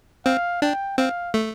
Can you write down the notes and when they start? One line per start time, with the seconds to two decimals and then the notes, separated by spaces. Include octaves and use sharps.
0.26 C4 F5
0.62 D4 G5
0.98 C4 F5
1.34 A3